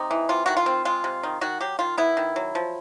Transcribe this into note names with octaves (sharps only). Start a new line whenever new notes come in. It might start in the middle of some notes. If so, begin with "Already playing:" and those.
Already playing: C3 D#4
E3
C3 F4
D#3 F#4
F4
C4
G#3 F4
C3
D#3
D#3 F#4
F#3 G4
D#3 F4
B3 E4
D#3
F#3
F3